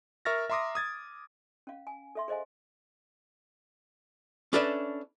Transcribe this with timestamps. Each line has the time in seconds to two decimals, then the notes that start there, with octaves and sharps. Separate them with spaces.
0.25 A#4 E5 C#6 F6 A6 A#6
0.50 E5 A#5 C6 D6 D#6 A#6
0.75 D#6 G#6 A6
1.67 C#4 F5
1.87 G#5
2.15 A4 E5 C6
2.28 G#4 C5 D#5 F5 G#5
4.53 C#4 D4 A4 B4 D5 E5